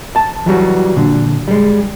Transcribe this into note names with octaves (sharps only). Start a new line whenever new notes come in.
A5
E3 F#3 G3 F#4
A#2 D3
G3 G#3